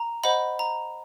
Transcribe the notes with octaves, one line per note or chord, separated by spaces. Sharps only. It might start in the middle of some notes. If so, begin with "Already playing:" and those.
Already playing: A#5
C5 D#5 F#5 B5
A#5